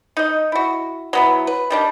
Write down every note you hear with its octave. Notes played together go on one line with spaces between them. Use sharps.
D#4 D#5
E4 F#4
F#3 B3 E4
B4
D#3 G3 D4